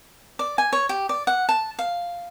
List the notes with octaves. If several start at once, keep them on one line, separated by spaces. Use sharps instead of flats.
D5
G#5
C#5
G4
D5
F#5
A5
F5